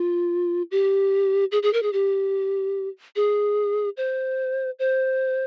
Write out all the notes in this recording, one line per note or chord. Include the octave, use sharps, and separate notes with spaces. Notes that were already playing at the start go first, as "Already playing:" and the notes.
Already playing: F4
G4
G#4
G#4
A#4
G#4
G4
G#4
C5
C5